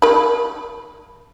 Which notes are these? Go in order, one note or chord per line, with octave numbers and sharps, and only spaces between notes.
A#4 B5